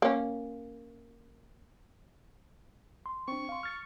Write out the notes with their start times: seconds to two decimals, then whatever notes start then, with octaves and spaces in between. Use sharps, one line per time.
0.02 A#3 C#4
3.06 C6
3.28 C4 D4 C#6
3.49 F5 C6
3.63 F6 A6 C#7